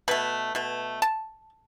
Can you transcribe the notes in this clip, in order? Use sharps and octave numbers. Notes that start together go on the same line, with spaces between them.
B2 A3 B4
B2 A3
A5